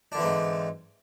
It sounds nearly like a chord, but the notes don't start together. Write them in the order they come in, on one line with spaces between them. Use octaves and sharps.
D4 D3 E3 C4 G#2